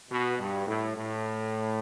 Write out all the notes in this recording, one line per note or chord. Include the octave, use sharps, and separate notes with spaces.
B2
G2
A2
A2